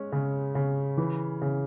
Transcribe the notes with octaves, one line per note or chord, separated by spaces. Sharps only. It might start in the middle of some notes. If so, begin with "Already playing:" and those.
Already playing: G#3 C#4
C#3
C#3
E3
C#3